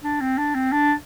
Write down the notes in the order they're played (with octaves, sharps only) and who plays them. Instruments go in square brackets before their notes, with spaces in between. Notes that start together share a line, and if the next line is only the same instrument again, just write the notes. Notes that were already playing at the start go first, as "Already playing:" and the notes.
[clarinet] D4
C4
D4
C4
D4